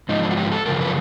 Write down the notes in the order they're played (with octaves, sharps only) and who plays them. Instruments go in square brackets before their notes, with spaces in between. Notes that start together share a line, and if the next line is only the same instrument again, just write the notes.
[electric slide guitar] G#2 F3 D#4
D4
F#4
G4
A4
F#2 C#3 F3 A#4
B4